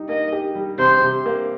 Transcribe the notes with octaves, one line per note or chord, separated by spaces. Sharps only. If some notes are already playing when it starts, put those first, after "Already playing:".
Already playing: G3 D#4
A#3 D#5
G4
G3
C3 C5
C3
A#3